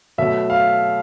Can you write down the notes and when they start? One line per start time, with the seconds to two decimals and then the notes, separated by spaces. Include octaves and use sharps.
0.18 B2 F#3 A3 E5
0.50 F5